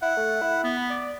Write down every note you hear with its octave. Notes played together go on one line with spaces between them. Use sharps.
E4 F#5
A3
E4
B3
B5
D5